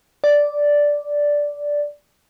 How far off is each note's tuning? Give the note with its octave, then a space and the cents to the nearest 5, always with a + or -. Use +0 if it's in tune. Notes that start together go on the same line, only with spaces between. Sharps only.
D5 -5